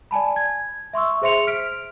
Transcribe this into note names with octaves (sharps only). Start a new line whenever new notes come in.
D5 G#5 A5 B5
G#6
E5 C6 C#6 E6
G#4 C5 E5 C6 C#7 F7
F6 B6 D7